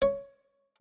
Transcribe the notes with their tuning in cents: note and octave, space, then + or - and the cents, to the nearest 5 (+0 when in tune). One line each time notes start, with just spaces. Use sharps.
C#5 +5